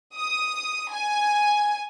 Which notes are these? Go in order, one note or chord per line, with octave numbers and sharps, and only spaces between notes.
D#6
G#5